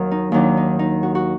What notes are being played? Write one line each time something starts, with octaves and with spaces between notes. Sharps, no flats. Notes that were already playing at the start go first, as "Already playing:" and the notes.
Already playing: D#2 D#3 F#3 A#4
D#4
D#2 D#3 F#3 D4
D#4
D#4
F#4
F#4